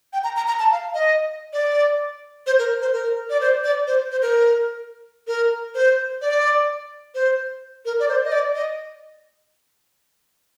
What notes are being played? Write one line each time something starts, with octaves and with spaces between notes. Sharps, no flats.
G5
A#5
A#5
A#5
A5
F5
D#5
D5
C5
A#4
C5
A#4
D5
C5
D5
C5
C5
A#4
A#4
C5
D5
C5
A#4
D5
C5
D#5
D5
D#5